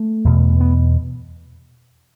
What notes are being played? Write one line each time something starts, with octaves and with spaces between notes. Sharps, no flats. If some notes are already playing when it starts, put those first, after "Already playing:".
Already playing: A3
E2 B2
B3